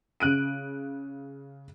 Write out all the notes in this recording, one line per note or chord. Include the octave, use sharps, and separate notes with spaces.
C#3 F#6 D7 D#7